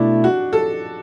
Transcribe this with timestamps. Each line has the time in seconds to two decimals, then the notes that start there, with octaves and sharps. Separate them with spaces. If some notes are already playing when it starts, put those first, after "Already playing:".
Already playing: B2 A3 D4 E4
0.24 F#4
0.53 A4